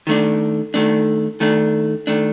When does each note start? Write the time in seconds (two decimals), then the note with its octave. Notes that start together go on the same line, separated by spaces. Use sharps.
0.07 D#3 A3 D4
0.74 D#3 A3 D4
1.40 D#3 A3 D4
2.07 D#3 A3 D4